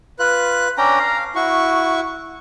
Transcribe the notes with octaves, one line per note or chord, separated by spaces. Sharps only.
F4 B4 F#6
C#4 D4 G5 A#5
F5
E4 F#4 C#6